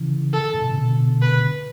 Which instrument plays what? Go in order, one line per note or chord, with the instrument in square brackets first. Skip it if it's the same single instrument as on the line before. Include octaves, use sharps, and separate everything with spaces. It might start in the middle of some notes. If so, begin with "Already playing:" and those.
Already playing: [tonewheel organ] C#3 E3
[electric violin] A4
[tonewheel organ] A2
B2
C#3
B2 D3
[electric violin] B4